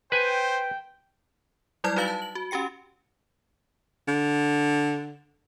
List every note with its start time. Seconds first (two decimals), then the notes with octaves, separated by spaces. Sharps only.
0.12 B4 C5 G5 G#5
1.84 F#3 G3 E4 D5 F6 G#6
1.96 D#4 F#4 B4 F5 A6 F#7
2.08 A5
2.22 F#7
2.35 F#4
2.51 C#4 F#4 G4 G5 C#7
4.08 D3